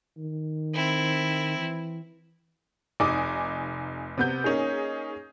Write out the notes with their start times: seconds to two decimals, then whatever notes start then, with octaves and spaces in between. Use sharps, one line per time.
0.18 D#3
0.73 C4 E4
1.58 E3
3.00 F1 D#4 G#5 D6 D#6
4.18 C3 B3 G6
4.44 A#3 C#4 D#4 G#4